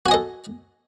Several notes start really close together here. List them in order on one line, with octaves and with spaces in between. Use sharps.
F#4 G#5 D#5 A4